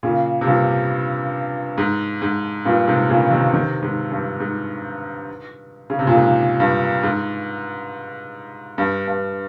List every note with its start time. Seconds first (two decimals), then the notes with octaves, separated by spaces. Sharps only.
0.03 A#2 C#3
0.41 C3
0.47 G2 A#2
1.78 G#2
2.22 G#2
2.65 G2 A#2
2.87 G#2 C3
3.10 A#2 C#3
3.31 C3 D#3
3.54 C3 D#3
3.82 G#2
4.12 G2
4.40 G#2
5.90 C#3
5.99 C3
6.07 A#2
6.16 G#2
6.60 G2
7.03 G#2
8.78 G2
9.08 G2